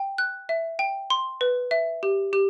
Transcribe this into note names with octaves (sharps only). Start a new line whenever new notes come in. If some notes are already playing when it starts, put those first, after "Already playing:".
Already playing: G5
F#6
E5
G5
C6
B4
E5
G4
G4